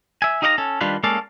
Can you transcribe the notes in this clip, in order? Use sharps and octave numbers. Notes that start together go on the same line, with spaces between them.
E5 G#5
D#4 G4 D#5 F5 F#5 A#5
C#4 A4
D#3 G3 D4 F4 G4 B4
G#3 A#3 C#4 A4 D5 F5